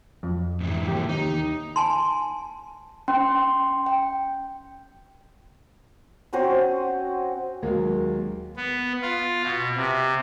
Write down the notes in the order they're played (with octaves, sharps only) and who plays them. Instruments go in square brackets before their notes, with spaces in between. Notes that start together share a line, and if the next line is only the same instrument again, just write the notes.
[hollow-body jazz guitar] F2
[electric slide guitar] G#2 C3 E3
[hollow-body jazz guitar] D#2 G4
[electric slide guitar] D#4
[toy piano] G#5 A5 C6
[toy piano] C#4 [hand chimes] G5 C6
[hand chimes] G5
[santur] C4 C#4 F#4 C5
[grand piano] D#2 F#3 G#3 A#3
[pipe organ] B3
F4
B2
C3